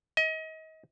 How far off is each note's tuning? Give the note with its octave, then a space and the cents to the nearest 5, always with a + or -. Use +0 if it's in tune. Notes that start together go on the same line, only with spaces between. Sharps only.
D#5 +30